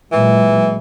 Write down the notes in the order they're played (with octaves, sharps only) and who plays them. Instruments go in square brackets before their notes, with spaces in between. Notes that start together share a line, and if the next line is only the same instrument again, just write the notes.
[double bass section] A#2 F#3 G#3 [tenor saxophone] E3